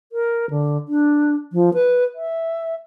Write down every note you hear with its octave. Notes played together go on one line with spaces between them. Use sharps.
A#4
D3
D4
F3
B4
E5